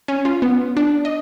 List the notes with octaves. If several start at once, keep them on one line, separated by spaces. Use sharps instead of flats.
C#4
F4
B3
D4
D#5